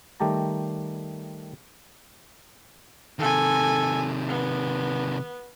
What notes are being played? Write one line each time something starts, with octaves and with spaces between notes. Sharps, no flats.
D#3 G3 A3 G4 A5 A#5
C3 D#3 A4 G#5
B3